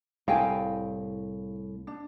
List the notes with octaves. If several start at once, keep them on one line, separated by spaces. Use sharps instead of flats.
C2 A2 F5 G5 G#5
D4